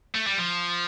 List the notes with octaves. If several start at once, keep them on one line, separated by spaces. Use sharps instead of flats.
A3
G3
F3